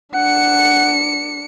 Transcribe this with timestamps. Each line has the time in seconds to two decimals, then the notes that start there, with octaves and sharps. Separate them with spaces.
0.14 D4 F#5 C#7